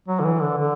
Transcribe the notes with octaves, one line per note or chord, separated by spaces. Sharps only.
F#3
D3
E3
D3
D3